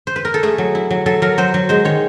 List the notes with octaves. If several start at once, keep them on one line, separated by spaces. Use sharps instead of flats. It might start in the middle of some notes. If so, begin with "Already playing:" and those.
C5
B4
A#4
A4
A3 G#4
F#3
E4
F#3
F#3 A4
F#3 A#4
F#3 C5
F#3
G#3 C5
D#3 C#5